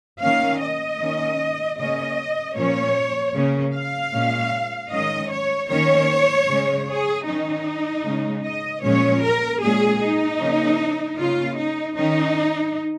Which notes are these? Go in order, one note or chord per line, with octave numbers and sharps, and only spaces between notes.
D#3 A#3 C#4 F5
D#5
D#3 A#3 C#4
C#3 A#3 C#4 D#5
A#2 F3 A#3 C#4 C#5
C#3 A#3 C#4
F5
A#2 G#3 C#4
D#3 G#3 C#4 D#5
C#5
D#3 A#3 C#4 C#5
C#3 G#3 C#4
G#4
D#3 C#4 D#4
C#3 G#3 C#4
D#5
A#2 F3 G#3 C#4 C#5
A#4
A#2 G#3 C#4 G#4
D#4
C#3 F3 A#3 C#4
C#3 A#3 C#4 F4
D#4
D#3 C#4 D#4